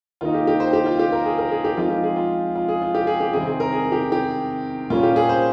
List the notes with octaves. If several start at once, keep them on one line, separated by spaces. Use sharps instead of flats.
D#3 A#3 D#4 F4
G4
G4
C5
G4
F4
G4
A#4
G#4
A#4
G#4
G4
F3 G#3 C4 D#4 F4
G4
G#4
F4
F4
G#4
F4
G4
G#4
G4
C3 D#3 G3 C4 G#4
G#4
A#4
G#4
G4
G4
A#2 G3 A#3 C#4 F4
G4
G#4
C5